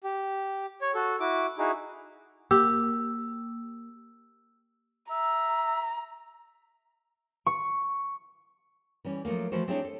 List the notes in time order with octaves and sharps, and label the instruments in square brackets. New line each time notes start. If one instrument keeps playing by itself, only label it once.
[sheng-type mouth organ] G4
C#5
F#4 A4
E4 F#4 D6
D#4 E4 F#4 G#4
[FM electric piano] A#3 [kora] G4 [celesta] E6
[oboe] E5 [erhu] A#5
[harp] C#6
[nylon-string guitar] E3 G3 C#4
F3 F#3 A3 A#3
E3 F3 A3 F#4 C5
C4 D4 E4 G4 G#4 C#5
A4